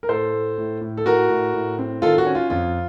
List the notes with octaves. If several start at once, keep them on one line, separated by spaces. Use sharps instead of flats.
A#4
A2 A4 C5
A3
A2
A2
A4
A2 F#4 A#4
A2
A2
C4
D#3 F4 A4
F#4
C#4
F4
F2 F4